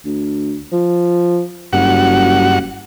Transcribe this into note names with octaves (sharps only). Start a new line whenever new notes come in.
D2
F3
F#1 G2 F#4 F#5